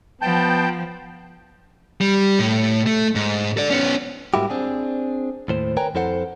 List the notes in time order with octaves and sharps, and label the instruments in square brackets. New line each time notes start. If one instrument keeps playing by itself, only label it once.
[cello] F3 [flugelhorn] B3 [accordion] G5 A5 G6
[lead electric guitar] G3
A2
A3
G#2
A4 D5
B3 C#4
[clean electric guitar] G#2 G3 A#3 E4 F#4 G4
C4 D4 G#4
D#2 A2 C5
A#4 B4 C#5 G5 G#5 A#5
F2 E4 A4 C5 F#5